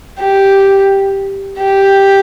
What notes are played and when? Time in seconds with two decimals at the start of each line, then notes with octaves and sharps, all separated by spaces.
0.19 G4
1.58 G4